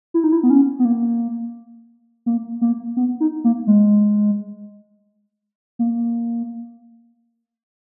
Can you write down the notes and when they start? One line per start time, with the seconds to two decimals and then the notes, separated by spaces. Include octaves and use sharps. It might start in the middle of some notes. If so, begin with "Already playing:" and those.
0.14 E4
0.24 D#4
0.32 E4
0.43 B3
0.50 C#4
0.79 B3
0.85 A#3
2.26 A#3
2.61 A#3
2.97 B3
3.20 D#4
3.44 A#3
3.67 G#3
5.79 A#3